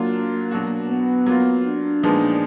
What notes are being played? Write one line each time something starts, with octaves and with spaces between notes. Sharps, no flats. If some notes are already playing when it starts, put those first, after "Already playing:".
Already playing: F#3 A#3 D4 F4
B2 F#3 D4 F#4
B3
F#3 A#3 F4
D4
A#2 F3 G#3 B3 D#4